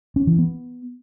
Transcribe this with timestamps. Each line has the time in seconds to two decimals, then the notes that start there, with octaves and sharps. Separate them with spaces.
0.16 C#4
0.27 E3
0.38 B3